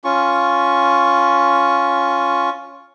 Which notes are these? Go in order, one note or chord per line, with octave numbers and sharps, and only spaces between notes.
C#4 F4 C#6